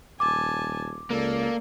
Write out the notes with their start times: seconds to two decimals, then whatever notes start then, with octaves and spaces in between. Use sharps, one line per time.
0.20 D#1 G#5 A5 D6
1.11 C#2 A#3 A4 D5